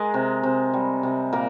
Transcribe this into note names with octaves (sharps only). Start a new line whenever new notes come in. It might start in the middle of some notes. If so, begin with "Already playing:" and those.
Already playing: G#3 G#4 A#4
C3
C3
G3
C3
A#2 A#3 A#4